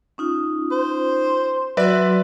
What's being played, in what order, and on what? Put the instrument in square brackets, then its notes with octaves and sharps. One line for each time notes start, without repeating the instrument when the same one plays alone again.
[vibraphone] C#4 D#4 F4
[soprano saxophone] C5
[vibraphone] F#3 F#4 C6 [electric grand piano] B4 D5 E5